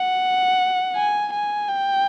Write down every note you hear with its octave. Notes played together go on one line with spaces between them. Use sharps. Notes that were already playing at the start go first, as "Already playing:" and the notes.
Already playing: F#5
G#5
G#5
G5